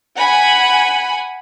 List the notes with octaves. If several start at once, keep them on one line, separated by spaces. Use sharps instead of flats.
F#5 G#5 B5